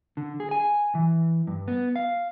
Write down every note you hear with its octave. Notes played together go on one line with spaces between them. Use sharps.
D3
G#4
G#5
E3
G2
B3
F5